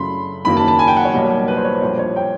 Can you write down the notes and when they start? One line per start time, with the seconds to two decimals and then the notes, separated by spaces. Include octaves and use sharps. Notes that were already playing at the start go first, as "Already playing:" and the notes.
Already playing: F#2 C#3 F#3 A3 B5 C6
0.45 F#1 F#2 D#3 F#3 A#3 B5
0.57 A5
0.68 A5
0.79 G#5
0.87 G5
0.96 F#5
1.05 C#5
1.13 B1 B2 G3 A#3
1.48 B4
1.56 C5
1.65 C#5
1.73 B4
1.82 A#1 A#2 G3 A#3 C5
1.99 C#5
2.16 G5